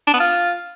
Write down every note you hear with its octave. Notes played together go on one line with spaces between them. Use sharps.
D4
B3
F4